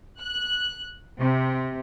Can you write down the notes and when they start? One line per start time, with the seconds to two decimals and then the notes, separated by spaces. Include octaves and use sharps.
0.21 F#6
1.20 C3